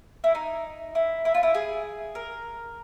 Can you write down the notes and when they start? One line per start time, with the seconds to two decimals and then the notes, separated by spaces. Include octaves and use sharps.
0.24 E4
0.35 D#4
0.95 E4
1.25 E4
1.34 F4
1.43 E4
1.54 G#4
2.15 A#4